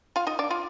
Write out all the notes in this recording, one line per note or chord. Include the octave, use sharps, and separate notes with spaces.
F4 F5
D#4 D#5
D4 D5
F4 F5